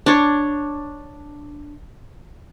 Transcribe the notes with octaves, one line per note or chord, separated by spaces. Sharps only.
D4 C#5